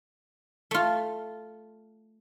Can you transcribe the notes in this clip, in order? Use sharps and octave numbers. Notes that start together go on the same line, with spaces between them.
A3 F4